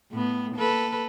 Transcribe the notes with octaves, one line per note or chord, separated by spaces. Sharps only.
A2 B3
A#3 A4 B4